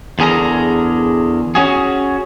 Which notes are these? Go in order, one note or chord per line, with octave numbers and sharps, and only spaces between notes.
E2 D3 G#4 A#4 A#5
C#4 F#4 G#4